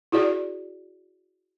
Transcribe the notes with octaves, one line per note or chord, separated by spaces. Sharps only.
E4 F#4 G#4 D5